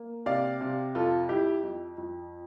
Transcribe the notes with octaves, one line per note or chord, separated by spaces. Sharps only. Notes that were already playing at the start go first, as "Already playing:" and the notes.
Already playing: A#3
C3 D5 F5
C3
F2 F4 A4
F2 E4 G4
F2
F2